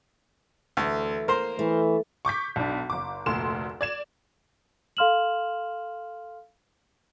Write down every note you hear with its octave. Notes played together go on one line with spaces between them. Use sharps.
D2 E3 A3
A#3 A#4 C5 C6
E3 A3
C#6 D6 G6 B6
B1 D4
F#1 D6
F1 D2 A#2 C6 E7
D5 G#6 E7
A4 F5 C6 F6 E7 F#7